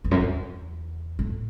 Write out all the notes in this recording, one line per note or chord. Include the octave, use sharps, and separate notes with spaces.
E2
F#2
E2
A2